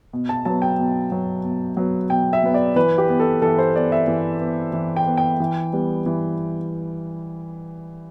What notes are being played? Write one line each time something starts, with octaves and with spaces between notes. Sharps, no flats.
B2
A5
F#3 B3 A5
G5
B2
F#3 B3
B2
F#3 B3
B2 G5
E5
F#3 B3
D5
E3 B4
G4
B3
A4
E3 A4
C5
B3 D5
E5
E3
B3
E3
G5
B3
G5
E3
G3 B3
E3